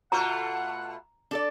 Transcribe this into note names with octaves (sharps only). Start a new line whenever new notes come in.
B2 A3 F4 F#5 A#5
D4 A4 D5